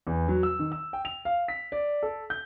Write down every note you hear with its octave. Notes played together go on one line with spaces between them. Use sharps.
E2
F#3
E6
D#3
E6
G5
F7
F5
B6
D5
A4
G6